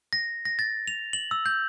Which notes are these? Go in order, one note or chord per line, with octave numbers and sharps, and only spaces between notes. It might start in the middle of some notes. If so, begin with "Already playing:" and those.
A#6
A#6
A6
F7
F#7
E6
G6